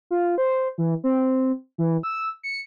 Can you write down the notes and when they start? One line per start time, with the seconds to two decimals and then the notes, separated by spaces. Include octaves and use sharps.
0.11 F4
0.38 C5
0.78 E3
1.04 C4
1.78 E3
2.03 E6
2.43 C#7